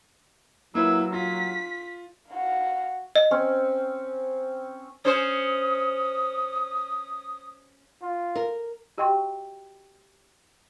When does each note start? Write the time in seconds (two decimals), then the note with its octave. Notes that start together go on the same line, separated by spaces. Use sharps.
0.75 A#2 F#3 A#3 E4 B4 E6
1.14 F4 B6
2.29 F#4 F5
3.16 D#5
3.31 C4 C#4
5.05 C#4 C5 D#6
8.02 F4
8.35 A#4
8.98 F#4 G4 D#5 G5 C6 C#6